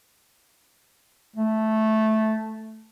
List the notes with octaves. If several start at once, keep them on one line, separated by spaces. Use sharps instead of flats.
A3